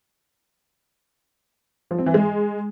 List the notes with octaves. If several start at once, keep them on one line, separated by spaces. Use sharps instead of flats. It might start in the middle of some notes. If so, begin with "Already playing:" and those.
F3
C4
E3
G#3